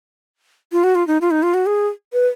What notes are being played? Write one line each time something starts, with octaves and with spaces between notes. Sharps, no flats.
F4
F#4
F4
D#4
F4
D#4
F4
F#4
G#4
B4